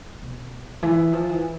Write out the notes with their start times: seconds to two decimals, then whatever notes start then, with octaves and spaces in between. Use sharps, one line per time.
0.22 B2
0.83 E3
1.13 F3
1.29 E3